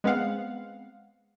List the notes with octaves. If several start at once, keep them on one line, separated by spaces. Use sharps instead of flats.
G#3 B3 C4 F5 F#5